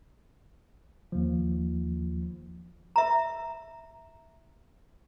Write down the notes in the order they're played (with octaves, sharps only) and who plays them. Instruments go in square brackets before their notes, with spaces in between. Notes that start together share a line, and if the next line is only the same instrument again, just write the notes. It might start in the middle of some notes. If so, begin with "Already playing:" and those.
[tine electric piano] D#2 F3
[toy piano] E5 A#5